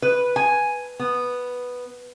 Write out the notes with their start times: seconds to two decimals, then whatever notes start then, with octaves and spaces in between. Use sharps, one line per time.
0.02 B4
0.36 G#5
0.99 B3